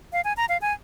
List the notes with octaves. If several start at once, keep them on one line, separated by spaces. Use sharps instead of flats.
F5
G#5
A#5
F5
G#5